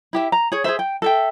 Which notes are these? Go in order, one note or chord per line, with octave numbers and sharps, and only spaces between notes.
E4 G4 E5
A#5
G#4 C#5
G#4 A#4 C5 E5
G5
A4 E5 G5